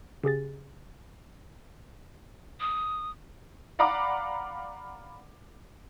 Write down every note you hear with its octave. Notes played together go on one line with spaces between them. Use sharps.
C#3 G4 G#4 A6
D#6
D5 F5 F#5 A#5 B5 D6